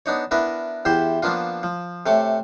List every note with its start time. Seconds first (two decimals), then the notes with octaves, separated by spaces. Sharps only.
0.06 B3 D4 D#4 C#5
0.31 B3 D4 E4 A#4 B4
0.85 E2 E4 G4 C5 G5 C6
1.22 F3 A#3 B3 D4 F4
1.63 F3
2.06 C3 A3 C#5 D6